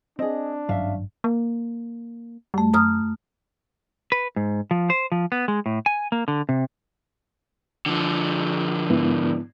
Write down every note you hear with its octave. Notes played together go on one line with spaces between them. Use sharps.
C4 D4 G#4 D#5
G#1 G2 F#3 C#4 E5 F5
A#3
F#2 G3 A3
F#2 A#5 D#6 F6
B4
G#2
F3
C5
F3
B3
G#3
A2
G#5
A#3
D3
C3
D3 F3
G#2 B3 E4